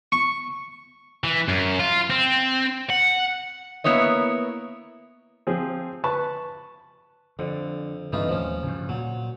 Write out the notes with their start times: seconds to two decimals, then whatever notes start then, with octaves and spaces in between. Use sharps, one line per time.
0.12 C#6
1.24 E3
1.48 F#2
1.80 F4
2.10 C4
2.90 F#5
3.84 A#3 B3 E4 C#5 D#5
5.47 F3 C4 G#4
6.04 B4 A5 B5 C#6
7.39 F2 D3
8.13 G2 E3 C4 D4 D#4 F4
8.29 D#2 A2 F3 C#4
8.63 G2 C#3
8.89 A#2 F#3